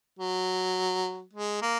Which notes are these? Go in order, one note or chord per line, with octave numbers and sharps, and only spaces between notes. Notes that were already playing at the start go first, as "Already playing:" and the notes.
F#3
G#3
A#3